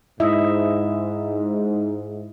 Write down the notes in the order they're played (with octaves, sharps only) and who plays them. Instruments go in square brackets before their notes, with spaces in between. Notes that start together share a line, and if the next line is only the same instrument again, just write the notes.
[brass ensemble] G#2 [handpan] E4 D#5 E5